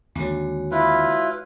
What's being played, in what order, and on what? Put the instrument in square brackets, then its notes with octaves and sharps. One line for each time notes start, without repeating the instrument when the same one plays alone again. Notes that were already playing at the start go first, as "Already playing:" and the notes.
[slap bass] D#2 D3 [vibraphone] G#3 F#4 C#5
[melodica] E4 F4 B4